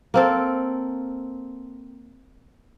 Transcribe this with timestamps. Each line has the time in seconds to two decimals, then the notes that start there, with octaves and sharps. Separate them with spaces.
0.14 A#3 C4 A4